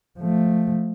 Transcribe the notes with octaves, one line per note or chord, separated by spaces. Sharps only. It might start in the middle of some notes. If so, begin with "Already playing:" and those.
F3 A3